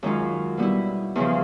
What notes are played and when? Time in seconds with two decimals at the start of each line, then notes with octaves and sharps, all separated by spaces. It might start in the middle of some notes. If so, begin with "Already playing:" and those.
0.03 F#2 D#3 G#3 C#4 F4
0.57 B2 G3 B3 E4
1.15 E2 C#3 F3